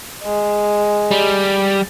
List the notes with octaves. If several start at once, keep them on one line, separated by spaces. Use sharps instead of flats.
G#3
G3